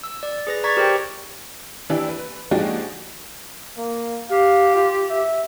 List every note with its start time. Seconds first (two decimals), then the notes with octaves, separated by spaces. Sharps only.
0.03 E6
0.23 D5
0.47 G#4 B4 A#6
0.64 D5 A#5 C#6 G#6 A6 B6
0.77 G4 A#4 C5 D5 G5 A#6
1.90 E3 D4 E4 G4
2.09 B4
2.51 F3 G#3 D4 D#4 F#4 G4
3.78 A#3
4.30 G4 F5
4.75 F4
5.10 E5